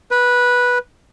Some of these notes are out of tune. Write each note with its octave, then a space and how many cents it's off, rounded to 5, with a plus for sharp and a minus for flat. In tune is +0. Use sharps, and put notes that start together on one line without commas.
B4 -10